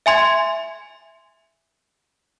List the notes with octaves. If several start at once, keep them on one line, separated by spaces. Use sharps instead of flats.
E5 G#5 C6 G#6